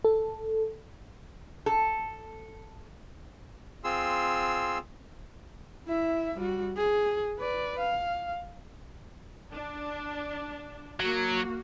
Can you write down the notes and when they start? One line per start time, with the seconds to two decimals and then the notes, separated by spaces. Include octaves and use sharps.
0.05 A4
1.66 A4
3.84 C4 F4 G#4 C6 E6
5.87 E4 E5
6.39 G3 F#4
6.77 G#4
7.40 B4 D5
7.80 F5
9.52 D4
11.00 F#3 A#3 F#4